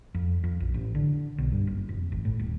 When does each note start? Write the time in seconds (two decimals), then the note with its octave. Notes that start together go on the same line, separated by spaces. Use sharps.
0.15 F2
0.44 F2
0.60 A#1
0.74 A1
0.95 D3
1.38 B1
1.52 G2
1.67 F#1
1.89 F1
2.12 G#1
2.25 A2
2.40 D#1